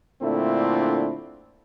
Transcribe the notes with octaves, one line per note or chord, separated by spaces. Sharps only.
A#2 D3 A3 C4 D4 E4